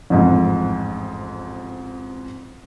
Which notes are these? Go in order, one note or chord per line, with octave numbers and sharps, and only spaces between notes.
A1 F2 G#2